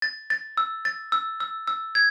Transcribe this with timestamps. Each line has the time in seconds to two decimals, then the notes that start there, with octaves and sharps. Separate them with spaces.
0.02 A6
0.30 A6
0.57 E6
0.85 A6
1.12 E6
1.40 E6
1.67 E6
1.95 G#6